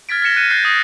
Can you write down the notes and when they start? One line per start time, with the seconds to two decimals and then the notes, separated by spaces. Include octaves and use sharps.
0.09 F6 G#6 A6 B6 D7
0.22 F6 G#6 A#6 C#7 E7 G7
0.36 F#6 D#7
0.50 F6 G6 A6 C7
0.65 D#6 A#6 C7